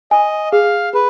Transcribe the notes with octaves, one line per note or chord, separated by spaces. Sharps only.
D#5 G#5
G#4 F5
G#4 B4